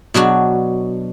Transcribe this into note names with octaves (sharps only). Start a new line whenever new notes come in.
B2 F#3 D4 F#4